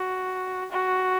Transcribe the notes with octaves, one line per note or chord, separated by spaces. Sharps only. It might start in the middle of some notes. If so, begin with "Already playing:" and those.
Already playing: F#4
F#4